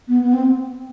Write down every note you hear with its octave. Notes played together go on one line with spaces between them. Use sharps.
B3
B3
C4